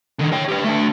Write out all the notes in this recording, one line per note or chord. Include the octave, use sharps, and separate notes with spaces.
D3 D#3
C#5 G5
G4 B4
A3 D4